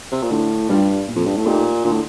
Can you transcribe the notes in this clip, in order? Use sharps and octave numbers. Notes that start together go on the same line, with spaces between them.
C3
A#2
A2 D3
G2 G3 D4 F4
A#2
F2
G2
A2
A#2 A3 D#4 G4
A#2 D3
A2